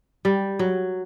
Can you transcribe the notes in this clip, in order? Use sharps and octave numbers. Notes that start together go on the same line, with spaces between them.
G3
F#3